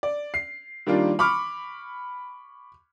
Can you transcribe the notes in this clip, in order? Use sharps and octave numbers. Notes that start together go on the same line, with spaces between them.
D5
C7
D#3 G3 A#3 D4 F4
B5 C#6 D6 F6